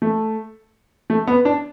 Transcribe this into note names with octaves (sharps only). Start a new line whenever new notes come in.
A3
A3
B3
D4